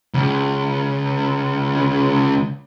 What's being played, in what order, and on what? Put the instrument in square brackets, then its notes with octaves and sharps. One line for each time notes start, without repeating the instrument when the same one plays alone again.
[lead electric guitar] C#2 C#3